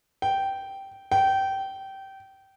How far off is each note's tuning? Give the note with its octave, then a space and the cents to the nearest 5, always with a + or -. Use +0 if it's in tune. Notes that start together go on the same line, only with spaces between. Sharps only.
G5 -10
G5 -20